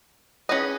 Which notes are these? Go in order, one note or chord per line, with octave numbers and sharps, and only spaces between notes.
C#4 G#4 B4 D#5